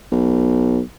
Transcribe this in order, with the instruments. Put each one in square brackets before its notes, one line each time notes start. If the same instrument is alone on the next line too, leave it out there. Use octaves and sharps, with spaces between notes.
[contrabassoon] B1